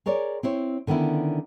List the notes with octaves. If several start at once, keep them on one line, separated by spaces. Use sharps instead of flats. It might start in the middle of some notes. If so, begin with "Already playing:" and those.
G#4 A#4 C#5 D5
C4 E4 C5 C#5
D3 D#3 B3 C#4 E4